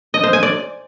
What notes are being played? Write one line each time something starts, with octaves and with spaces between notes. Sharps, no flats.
D#5
C5
G#5
D5